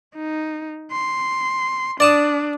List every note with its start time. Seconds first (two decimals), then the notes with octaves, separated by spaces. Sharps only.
0.16 D#4
0.91 C6
2.00 D4 D5 A5 D#6